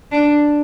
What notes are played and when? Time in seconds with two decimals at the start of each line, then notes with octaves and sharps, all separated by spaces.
0.12 D4